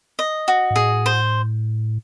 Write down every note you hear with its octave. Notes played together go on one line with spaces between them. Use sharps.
D#5
F#4
G#2
A2 G#4
C5